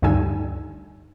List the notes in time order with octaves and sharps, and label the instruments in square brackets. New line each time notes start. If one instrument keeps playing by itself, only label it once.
[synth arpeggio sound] D2 G2 D3 D#4 G#5 E6